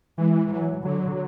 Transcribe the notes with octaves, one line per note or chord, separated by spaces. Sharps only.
E3 G#3
F#3
D3 F#3